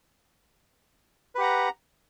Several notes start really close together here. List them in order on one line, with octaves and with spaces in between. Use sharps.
B4 G4 F#5 A#5